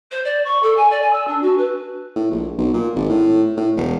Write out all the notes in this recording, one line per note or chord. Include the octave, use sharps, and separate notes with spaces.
C5
D5
C#6
A4
G#5
D5
G#5
E6
D4
F#4
B4
A2
A#1
B1
A#2
G#1
A2
A2
E1